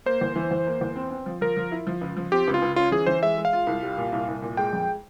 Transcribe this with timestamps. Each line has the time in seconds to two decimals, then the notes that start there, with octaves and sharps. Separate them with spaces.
0.06 A#3 C5
0.21 E2
0.36 E3
0.51 E2
0.66 A#3
0.81 E2
0.96 C4
1.11 C4
1.26 F3
1.41 F3 A#4
1.57 F3
1.72 E4
1.87 F3
2.01 C#2
2.17 F3
2.32 C4 G4
2.47 C#2
2.54 F4
2.62 C#2
2.76 C#4 F4
2.92 E3 G#4
3.06 E3 C5
3.22 G#3 E5
3.38 G#3
3.45 F5
3.53 F4
3.67 C2
3.82 G3
3.97 A#2
4.12 C2
4.28 C2
4.42 A#2
4.57 G#3 G5
4.73 F2